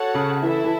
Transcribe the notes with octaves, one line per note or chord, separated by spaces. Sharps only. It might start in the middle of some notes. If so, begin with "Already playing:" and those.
Already playing: F#4 A4 C#5 F#5 A5
C#3
E3 E4 A4 E5
E3